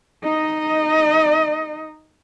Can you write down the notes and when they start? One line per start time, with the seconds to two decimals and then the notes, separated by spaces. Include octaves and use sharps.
0.24 D#4 D#5